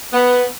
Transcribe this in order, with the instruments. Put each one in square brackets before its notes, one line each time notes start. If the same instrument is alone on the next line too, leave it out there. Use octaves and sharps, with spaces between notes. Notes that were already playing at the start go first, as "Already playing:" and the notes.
[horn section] B3